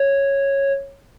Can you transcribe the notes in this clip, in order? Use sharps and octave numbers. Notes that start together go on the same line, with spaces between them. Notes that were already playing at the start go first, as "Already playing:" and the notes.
Already playing: C#5